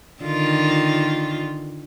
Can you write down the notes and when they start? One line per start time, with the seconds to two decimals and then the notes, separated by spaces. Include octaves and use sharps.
0.23 D3 D#3 F4